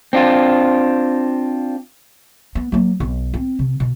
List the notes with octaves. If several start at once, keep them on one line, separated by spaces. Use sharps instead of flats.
C4 D4 F4
B3
F#3 A#3
B1
C4
C3
B2